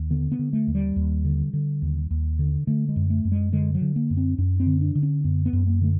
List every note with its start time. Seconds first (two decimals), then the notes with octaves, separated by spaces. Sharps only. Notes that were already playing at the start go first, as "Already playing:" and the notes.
Already playing: D#2
0.10 D3 B3
0.32 B3
0.39 D3
0.53 A3
0.67 D#2
0.75 G3
0.96 D#2
1.25 D3
1.53 D3
1.82 D#2
2.11 D#2
2.39 D3
2.67 D3 A3
2.89 G#3
2.96 F#2
3.10 A3
3.25 F#2
3.32 G#3
3.53 D3 G#3
3.75 F#3
3.81 D3
3.96 A#3
4.10 F#2
4.17 C4
4.38 F#2 C#4
4.60 C4
4.67 D3
4.81 D4
4.95 D3
5.03 C#4
5.24 F#2 B3
5.46 B3
5.53 F#2
5.67 A#3
5.81 D3 A3